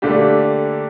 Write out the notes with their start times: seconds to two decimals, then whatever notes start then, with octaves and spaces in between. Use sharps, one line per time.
0.02 D3 A3 A#3 D4 G4